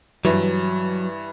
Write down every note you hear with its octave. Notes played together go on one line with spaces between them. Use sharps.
G2 E3 F#3